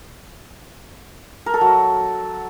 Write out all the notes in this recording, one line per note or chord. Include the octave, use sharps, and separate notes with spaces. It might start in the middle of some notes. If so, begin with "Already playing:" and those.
A#4
A4
F#3